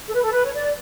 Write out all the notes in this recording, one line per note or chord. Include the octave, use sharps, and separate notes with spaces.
A4
B4
A4
B4
C#5
D5